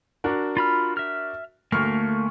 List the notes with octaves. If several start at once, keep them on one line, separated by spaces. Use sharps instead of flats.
D4 F#4 A#4
F4 B5 F6
E5 F6
D2 A3 A#3 C#6 F6